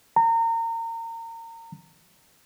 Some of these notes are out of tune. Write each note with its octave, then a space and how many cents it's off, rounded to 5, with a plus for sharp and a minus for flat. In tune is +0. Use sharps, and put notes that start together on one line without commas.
A#5 -30